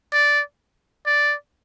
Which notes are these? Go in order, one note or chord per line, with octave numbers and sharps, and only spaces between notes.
D5
D5